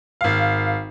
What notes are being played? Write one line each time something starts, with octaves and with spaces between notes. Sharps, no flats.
G#1 F5